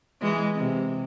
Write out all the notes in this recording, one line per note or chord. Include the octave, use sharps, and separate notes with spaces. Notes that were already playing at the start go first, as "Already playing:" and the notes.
E3 G#3
C3